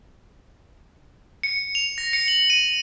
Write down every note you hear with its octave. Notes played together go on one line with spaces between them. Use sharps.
C#7
F7
A#6
C#7
F#7
D#7